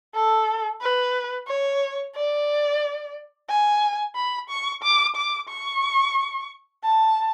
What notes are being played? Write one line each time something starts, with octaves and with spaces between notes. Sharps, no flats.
A4
B4
C#5
D5
G#5
B5
C#6
D6
D6
C#6
A5